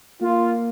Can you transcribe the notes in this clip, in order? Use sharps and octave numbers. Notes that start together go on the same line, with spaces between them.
A#3 F4